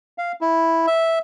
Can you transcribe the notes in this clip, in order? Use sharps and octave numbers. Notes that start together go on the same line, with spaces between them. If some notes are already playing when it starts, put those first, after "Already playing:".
F5
E4
E5